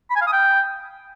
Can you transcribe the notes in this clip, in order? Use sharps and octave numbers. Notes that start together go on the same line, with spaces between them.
B5
G#5
F5
D#6
G5